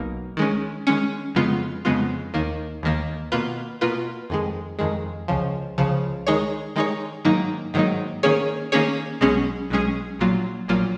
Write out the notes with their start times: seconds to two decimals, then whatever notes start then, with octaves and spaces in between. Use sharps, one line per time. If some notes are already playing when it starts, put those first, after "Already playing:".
Already playing: B1 B2 A#3 D#4
0.37 D#3 G#3 C#4
0.87 D#3 G#3 C#4
1.35 F2 C#3 G#3 B3 F4
1.85 F2 C#3 G#3 B3 F4
2.34 D#2 D#3 A#3
2.83 D#2 D#3 A#3
3.32 B2 A#3 F4 B4
3.81 B2 A#3 F4 B4
4.30 F2 D#3 G#3
4.79 F2 D#3 G#3
5.28 C#2 C#3 F3
5.78 C#2 C#3 F3
6.27 D#3 G#3 D#4 G#4 C#5
6.76 D#3 G#3 D#4 G#4 C#5
7.25 G#2 D#3 F#3 A#3 D#4
7.74 G#2 D#3 F#3 A#3 D#4
8.23 D#3 A#3 C#4 G#4 C#5
8.72 D#3 A#3 C#4 G#4 C#5
9.21 B1 B2 G#3 C#4 G#4
9.70 B1 B2 G#3 C#4 G#4
10.19 A#1 A#2 F#3 A#3 F4
10.68 A#1 A#2 F#3 A#3 F4